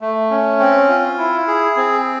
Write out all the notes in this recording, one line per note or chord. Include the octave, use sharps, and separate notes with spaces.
A3
C#4
C4
F4
E4
G#4
C4